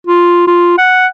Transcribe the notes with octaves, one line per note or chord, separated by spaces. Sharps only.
F4
F4
F#5